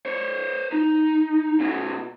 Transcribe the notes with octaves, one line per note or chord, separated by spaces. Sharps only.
C5 C#5
D#4
B2 C#4